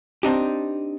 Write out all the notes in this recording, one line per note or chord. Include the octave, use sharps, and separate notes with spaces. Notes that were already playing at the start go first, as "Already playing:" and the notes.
C4 D4 D#4 G4